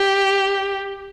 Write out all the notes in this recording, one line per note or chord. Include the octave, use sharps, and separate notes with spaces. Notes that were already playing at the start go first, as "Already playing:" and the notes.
Already playing: G4